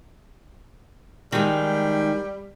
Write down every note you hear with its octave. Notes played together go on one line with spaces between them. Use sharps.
D#3 G3 G#3